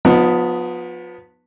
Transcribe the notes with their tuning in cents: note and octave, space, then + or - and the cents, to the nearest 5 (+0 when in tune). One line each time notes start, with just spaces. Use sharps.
F3 +35 B3 +0 D#4 +0